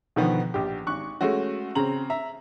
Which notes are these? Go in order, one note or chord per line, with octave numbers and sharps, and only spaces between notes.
B2 D3 D#3 F3 B3
A#1 G4
G#1 C#6 F#6
G#3 A3 C#4 F#4
C#3 C4 A#5 F#7
E5 A#5